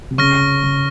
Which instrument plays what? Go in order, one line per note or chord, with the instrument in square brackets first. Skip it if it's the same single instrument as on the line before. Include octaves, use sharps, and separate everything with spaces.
[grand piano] C3
[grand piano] C#3 [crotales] C#6 F6 A#6
[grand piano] C#3